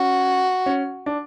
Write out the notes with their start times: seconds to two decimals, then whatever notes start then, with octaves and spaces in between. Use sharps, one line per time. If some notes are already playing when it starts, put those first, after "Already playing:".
Already playing: C#4 F#4
0.66 C#4
1.06 D4